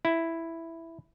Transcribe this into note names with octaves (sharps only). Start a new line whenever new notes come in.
E4